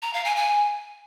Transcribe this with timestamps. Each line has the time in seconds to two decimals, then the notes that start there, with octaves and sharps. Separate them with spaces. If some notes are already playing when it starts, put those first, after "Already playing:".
0.02 A#5
0.14 F5
0.25 G#5
0.36 G#5